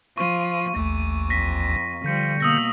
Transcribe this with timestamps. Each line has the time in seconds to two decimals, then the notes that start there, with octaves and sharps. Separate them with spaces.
0.18 F3 C#6 D#7
0.76 A1 D#2 A3
1.30 F2 A#6 B6
2.04 D3 F3 G3 G6 C#7
2.40 B2 A#3 D#6 E6 A#6